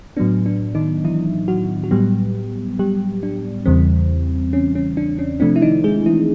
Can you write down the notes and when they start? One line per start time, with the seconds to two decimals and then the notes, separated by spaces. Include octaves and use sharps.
0.17 A2 F#3 B3 D4
0.46 D4
0.75 D#3 D#4
1.04 E3 E4
1.48 F#3 F#4
1.84 F#4
1.91 A2 F#3 G3 B3 G4
2.79 G3 G4
3.23 D4
3.66 E2 C#3 E3 G3 C4
4.53 C#4
4.75 C#4
4.97 D4
5.19 C#4
5.40 C3 F3 A3 C4 D4
5.56 E4
5.62 D#3 D#4
5.84 G#3 G#4
6.06 E3 E4